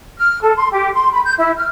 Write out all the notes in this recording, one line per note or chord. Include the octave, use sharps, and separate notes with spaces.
F6
A4
C6
G4
C6
B5
G6
E4
F6